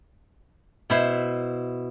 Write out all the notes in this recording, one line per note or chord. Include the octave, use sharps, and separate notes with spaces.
B2 E4 C5